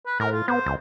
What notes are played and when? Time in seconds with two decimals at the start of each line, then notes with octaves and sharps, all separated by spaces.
0.06 B4
0.20 A2 A#4
0.32 F4
0.48 B3 C5
0.66 C#2